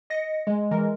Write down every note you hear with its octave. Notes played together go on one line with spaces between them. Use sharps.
D#5 A#6 C#7
G#3
E3 G#3 A#4